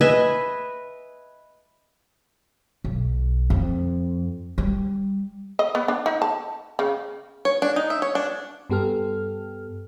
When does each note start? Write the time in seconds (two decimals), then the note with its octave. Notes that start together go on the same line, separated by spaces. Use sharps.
0.01 B4 D#5 E5 G#5
2.84 B1
3.50 F2
4.58 G3
5.59 D#5
5.75 B3
5.88 D4
6.06 D#4
6.22 A5
6.79 C#3
7.45 C#5
7.62 D4
7.76 D#4
7.90 E5
8.02 C#5
8.15 D4
8.70 G2 B3 G4 A4 F6